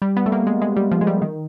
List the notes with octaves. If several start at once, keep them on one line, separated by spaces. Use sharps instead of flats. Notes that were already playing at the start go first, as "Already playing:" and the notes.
G3
B3
A3
A#3
G#3
G#3
G3
F3
G#3
G3
D#3